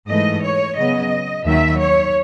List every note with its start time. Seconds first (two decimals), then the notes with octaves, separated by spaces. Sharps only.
0.09 G#2 E3 A3 D#5
0.44 C#5
0.78 C#3 F#3 B3 D#5
1.46 D#2 D#3 F#3 E5
1.80 C#5